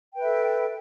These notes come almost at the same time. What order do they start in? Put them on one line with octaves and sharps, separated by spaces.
G5 B4 E5 A4